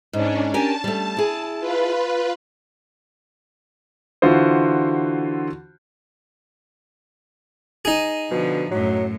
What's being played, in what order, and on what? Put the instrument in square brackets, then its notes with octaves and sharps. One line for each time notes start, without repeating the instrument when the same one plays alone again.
[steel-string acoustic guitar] G#2 [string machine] C#4 D4
[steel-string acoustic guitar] G4 A#4 G#5 [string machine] A5
[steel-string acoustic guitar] G3 A3
E4 G#4
[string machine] F4 B4
[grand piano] D3 E3 F4 F#4 C5
[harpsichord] D#4 G#4
[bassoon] B2 [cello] D3 F3
[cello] F#2 A2 [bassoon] F#3